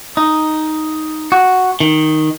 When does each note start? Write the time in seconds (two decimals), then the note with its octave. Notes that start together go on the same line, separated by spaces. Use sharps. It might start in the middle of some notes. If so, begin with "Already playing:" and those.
0.17 D#4
1.32 F#4
1.80 D#3